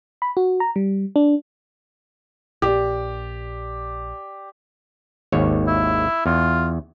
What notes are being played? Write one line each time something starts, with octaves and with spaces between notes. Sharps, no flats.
B5
F#4
A#5
G3
D4
A#1 G4 D5
G#1 D#2 C#5
E4
E2 F4